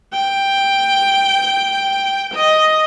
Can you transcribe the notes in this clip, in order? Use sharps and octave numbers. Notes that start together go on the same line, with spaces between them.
G5
D#5